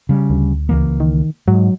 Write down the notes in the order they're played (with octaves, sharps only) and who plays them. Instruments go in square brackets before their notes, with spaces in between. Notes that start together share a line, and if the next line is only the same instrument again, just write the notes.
[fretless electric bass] C#3 G3
[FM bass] D2
[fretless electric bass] C#2 E3 A#3
[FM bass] D#3
[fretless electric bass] G#2 [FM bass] F#3